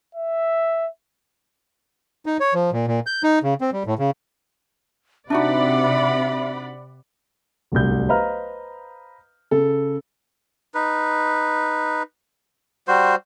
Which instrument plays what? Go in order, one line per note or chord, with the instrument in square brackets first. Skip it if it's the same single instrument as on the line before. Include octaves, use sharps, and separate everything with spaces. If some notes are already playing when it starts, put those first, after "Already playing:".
[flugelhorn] E5
[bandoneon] D#4
C#5
F3
A#2
A#2
G6
D#4
C#3
C4
G3
A2
C#3
[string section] C3 [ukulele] D4 D#4 F#4 [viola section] D5 F#5 B5 [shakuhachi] E5
[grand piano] D1 G1 C2 G6
B4 C5 D#5 F5 A#5 F6
C#3 A4
[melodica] D#4 B4
G3 F#4 C5